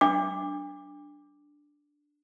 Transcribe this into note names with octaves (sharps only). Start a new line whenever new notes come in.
D4 D6